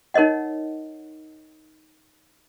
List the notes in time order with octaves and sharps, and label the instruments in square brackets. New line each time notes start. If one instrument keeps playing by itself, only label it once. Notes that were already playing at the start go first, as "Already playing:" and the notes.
[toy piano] D#4 A#4 C#5 D#5 F#5